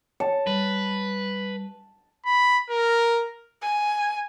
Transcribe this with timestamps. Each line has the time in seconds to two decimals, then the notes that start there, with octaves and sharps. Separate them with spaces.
0.20 C#5 A5
0.47 G3 B4
2.25 B5
2.70 A#4
3.62 G#5